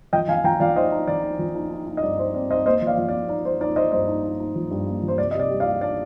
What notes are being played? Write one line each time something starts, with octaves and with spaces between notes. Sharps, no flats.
F3 D#5 G5
F3 F5 G#5
F3 G5 A#5
F3 D5 F5
D#4 C5 D#5
D#4
F3 D5
D#4
F3
D#4
D#4
D#4
D#5
G2 D5
D#4 C5
C4 D5
D#4 C5 D#5
A#3 C5 D#5
F3
D5 F5
F3
D5
A#3
D#4 D5
D#4 C5
D#4 D5
D#4 C5 D#5
G2 C5 D#5
D#4
D#4
D#4
F3
G2
A#3
F3
C5
C3 D5
D#5
C3 D5
G3
D5 F5
G3
D4 D5